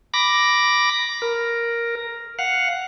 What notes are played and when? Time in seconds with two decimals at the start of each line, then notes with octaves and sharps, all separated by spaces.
0.14 B5 D6 A#6
1.22 A#4
2.39 F5 F#5